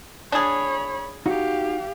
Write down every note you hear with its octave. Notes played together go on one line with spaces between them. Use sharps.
D4 G#4 C#5 B5
D#4 F#4 G4 F5 F#5